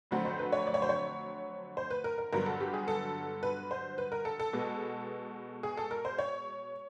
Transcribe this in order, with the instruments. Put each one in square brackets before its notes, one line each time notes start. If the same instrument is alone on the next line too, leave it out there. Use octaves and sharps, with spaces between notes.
[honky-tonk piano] F2 D3 F#3 A3 C4 F#5
C5
B4
C#5
D5
C#5
C5
C#5
C5
B4
A#4
A#4
G2 D3 F#3 B3 A#4
A4
G4
G#4
A4
B4
C5
B4
A#4
A4
A4
B2 G#3 B3
G#4
A4
A#4
C5
C#5